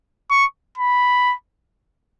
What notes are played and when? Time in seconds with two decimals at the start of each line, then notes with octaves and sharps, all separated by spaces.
0.31 C#6
0.78 B5